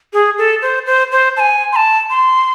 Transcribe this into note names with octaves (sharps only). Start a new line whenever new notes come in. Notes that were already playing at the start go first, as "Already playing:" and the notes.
G#4
A4
C5
C5
C5
A5
G#5
C6
A5
C6